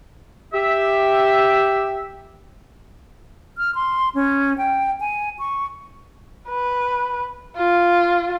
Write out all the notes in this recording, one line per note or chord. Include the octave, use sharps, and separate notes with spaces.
G4 E5
F6
C6
C#4
G5
G#5
C#6
B4
F4